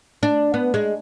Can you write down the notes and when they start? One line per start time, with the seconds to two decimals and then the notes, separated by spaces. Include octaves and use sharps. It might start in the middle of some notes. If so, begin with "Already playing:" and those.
0.23 D4
0.54 B3
0.74 G#3